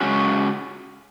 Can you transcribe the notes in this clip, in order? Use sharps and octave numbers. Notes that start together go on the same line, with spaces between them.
C#3 G#3 C#4 F#4